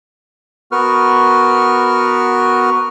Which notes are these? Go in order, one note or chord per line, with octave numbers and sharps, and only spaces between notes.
B3 F#4 A#4 B4 C#6 F6